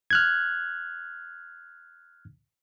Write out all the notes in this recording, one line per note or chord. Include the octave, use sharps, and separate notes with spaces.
F6 F#6 G#6